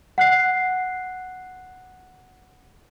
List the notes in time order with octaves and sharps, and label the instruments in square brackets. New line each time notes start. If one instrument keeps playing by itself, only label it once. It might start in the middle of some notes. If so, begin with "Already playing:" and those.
[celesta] F#5 F#6 C7